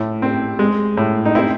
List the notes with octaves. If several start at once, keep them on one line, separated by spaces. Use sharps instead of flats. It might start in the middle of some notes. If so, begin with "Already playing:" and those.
Already playing: A2
C4
G#3
A2
D#4
C4 E4